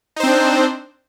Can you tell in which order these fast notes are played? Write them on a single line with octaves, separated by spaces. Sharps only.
D#4 C5 C4 D4